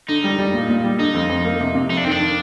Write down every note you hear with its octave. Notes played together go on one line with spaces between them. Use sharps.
D3 D#4
G3
G3
A#2
A#2
G3
D3 D#4
F2
F2
A#3
C3
C3
F2 D#4
D4
D#3 C4
D4
D#3